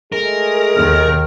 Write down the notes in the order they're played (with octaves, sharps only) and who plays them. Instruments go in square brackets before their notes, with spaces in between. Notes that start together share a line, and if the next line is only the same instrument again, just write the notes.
[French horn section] G#3 A3 G#4 [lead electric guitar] A#4
[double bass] D#2 D#3 [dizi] F6